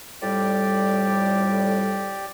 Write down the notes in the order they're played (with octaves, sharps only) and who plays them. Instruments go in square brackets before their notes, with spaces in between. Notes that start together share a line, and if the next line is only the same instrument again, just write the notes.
[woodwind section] F2 A2 G3 [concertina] G4 D5